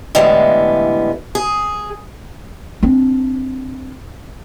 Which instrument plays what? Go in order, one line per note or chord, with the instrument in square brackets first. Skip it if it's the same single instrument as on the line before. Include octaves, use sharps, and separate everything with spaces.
[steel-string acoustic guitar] A2 D3 E3 G3 G#3 B3
G#4
[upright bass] C4 D4